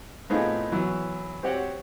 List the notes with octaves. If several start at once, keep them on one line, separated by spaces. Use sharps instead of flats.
A2 B3 C4 D#4 F4 G#4
E3 F#3 B3 E4
C4 F#4 G4 C5 C#5 F#5